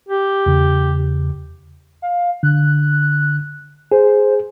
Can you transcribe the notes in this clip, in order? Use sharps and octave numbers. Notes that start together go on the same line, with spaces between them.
G4
E2 C#3
F5
D3 F#6
G#4 C5